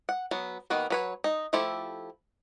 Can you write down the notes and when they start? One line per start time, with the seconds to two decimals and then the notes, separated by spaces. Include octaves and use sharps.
0.09 F#5
0.31 F#3 B3
0.70 D#3 A#3 B3 F#4 B4
0.90 F#3 B4 C#5
1.24 D#4
1.53 F3 A3 E4 G4 A4